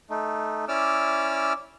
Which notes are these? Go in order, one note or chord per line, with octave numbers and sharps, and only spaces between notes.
A3 D#4
C#4 E4 D5 D6 E6 F6